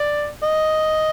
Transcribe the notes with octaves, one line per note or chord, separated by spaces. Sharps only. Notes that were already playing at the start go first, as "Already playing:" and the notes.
Already playing: D5
D#5